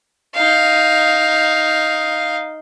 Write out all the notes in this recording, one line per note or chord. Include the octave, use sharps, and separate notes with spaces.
D#4 F5